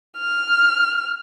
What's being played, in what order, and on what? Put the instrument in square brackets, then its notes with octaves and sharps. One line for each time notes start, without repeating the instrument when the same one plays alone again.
[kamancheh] F6